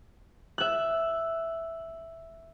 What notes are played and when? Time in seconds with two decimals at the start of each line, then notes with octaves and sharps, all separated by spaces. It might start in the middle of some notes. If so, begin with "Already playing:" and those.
0.58 E5 F#6